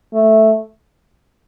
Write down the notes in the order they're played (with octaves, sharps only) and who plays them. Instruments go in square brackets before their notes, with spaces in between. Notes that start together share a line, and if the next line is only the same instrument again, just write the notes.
[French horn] A3